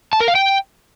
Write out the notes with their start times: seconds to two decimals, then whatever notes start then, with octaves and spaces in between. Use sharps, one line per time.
0.13 A5
0.20 A#4
0.28 F5
0.35 G5